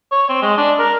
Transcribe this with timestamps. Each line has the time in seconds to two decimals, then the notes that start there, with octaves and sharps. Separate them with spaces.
0.11 C#5
0.29 C4
0.42 G#3
0.58 D4
0.79 A#4